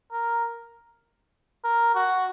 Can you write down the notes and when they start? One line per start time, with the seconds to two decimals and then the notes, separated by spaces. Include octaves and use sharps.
0.12 A#4
1.64 A#4
1.95 F#4